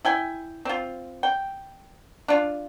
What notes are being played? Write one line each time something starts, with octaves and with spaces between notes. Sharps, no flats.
E4 G5 G#5
C4 F4
G5
D4 F4